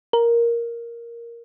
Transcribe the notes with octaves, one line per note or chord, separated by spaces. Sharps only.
A#4